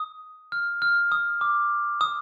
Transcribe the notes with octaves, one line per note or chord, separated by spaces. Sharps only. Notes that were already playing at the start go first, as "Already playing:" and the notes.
Already playing: D#6
F6
F6
D#6
D6
D#6